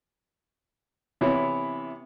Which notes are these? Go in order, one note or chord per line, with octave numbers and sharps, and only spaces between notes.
C3 E3 B3 E4 C#5